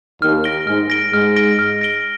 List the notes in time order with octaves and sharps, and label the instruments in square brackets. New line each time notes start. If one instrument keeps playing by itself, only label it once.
[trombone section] D#2 D#3 [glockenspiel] F6
[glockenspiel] A#6 D7 G7
[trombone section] G#2 G#3 [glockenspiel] F6
[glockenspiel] A#6 D7 G7
[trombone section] G#2 G#3 [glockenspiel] F6
[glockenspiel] A#6 D7 G7
F6
A#6 D7 G7